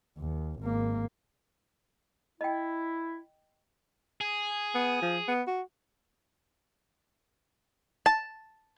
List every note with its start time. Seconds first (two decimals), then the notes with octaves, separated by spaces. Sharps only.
0.18 D#2
0.60 G#1 A#3
2.41 E4 D#5 G5
4.21 G#4
4.74 B3
5.02 F3
5.28 B3
5.47 F#4
8.06 A5